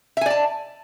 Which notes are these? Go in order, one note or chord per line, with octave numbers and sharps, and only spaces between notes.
D5 E5 G#5 A5